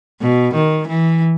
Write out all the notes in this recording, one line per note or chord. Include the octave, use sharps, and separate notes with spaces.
B2
D#3
E3